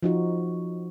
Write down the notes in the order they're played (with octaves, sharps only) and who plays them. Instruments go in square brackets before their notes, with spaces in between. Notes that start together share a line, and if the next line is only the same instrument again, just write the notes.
[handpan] F3 D#4 F#4